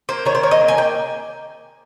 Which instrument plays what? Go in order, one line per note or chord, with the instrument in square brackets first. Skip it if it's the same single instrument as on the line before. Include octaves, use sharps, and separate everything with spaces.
[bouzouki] A#3 C5
D#3 C#5
C5
A#3 C#5
D#5
D#3
G#5
A#3 G5